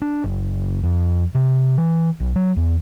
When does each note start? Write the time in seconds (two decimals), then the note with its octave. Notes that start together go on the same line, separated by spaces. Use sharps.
0.02 D4
0.24 F#1
0.83 F2
1.35 C3
1.77 E3
2.20 B1
2.36 F#3
2.56 E2